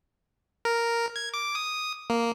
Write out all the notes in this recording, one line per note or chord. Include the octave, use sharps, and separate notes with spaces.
A#4
G#6
D6
D#6
A#3